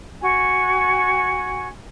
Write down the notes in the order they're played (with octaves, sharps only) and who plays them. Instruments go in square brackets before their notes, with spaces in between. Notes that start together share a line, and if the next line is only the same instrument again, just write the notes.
[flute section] F#4 G#5